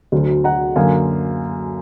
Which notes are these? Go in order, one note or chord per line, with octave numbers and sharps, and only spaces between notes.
D2 D3 F#3
F#5 A#5
F#2 D3 F#3 A#3 F5 G#5